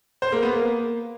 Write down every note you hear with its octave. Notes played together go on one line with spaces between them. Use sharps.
C5
A#3
B3
A#3